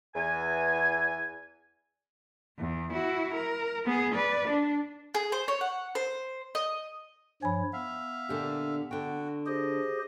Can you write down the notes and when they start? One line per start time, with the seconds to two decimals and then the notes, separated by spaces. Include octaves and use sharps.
0.15 E2 G#5
2.58 E2
2.93 E4 F#4
3.34 A#4
3.85 B3 G#4
4.15 B4 D5
4.48 D4
5.14 G#4
5.32 C5
5.48 C#5
5.61 F#5
5.95 C5
6.55 D#5
7.42 G2 F3 C#5 G#5 B5
7.73 B3 E5 F5
8.29 A#2 D3 G4
8.91 D3 F#4 G5
9.46 G4 G#4 C5 D#5